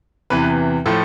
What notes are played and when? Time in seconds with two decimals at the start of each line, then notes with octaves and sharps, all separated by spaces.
0.30 E2 C3 E3 B4
0.86 A2 F3 A3 A4